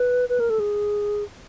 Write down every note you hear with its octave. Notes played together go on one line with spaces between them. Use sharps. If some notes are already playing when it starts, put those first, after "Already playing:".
Already playing: B4
B4
A#4
A4
G#4